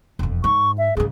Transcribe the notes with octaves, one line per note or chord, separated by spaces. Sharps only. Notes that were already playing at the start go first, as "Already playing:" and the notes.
E1 F2
G#2 C#6
E5
G#2 C#3 G#4